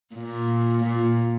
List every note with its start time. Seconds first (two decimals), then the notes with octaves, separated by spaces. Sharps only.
0.15 A#2
0.83 A#2